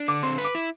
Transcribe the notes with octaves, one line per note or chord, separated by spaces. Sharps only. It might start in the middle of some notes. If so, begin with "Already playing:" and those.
Already playing: D4
D3 D6
C4 C6
B4
D6
E4